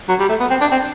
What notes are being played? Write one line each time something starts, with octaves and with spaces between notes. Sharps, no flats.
F#3
G3
A3
B3
C4
D4
C4